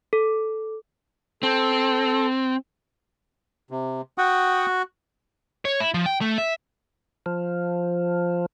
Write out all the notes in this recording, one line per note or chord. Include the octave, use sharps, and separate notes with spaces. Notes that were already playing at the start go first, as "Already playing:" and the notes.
A4
C4 A4
C3
F#4 F#5 G5 D#6
C#5
E4
F3
G5
A3
E5
F3